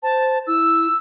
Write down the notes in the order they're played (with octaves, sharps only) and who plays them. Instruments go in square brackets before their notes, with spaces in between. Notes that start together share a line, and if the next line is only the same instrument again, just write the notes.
[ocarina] C5 [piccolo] A5
[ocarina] E4 [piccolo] E6